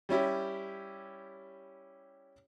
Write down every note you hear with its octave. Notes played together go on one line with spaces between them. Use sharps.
G3 C#4 E4 G4